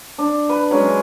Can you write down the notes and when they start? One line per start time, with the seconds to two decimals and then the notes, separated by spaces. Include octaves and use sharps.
0.18 D4
0.49 B4
0.71 F#3 G#3 C#4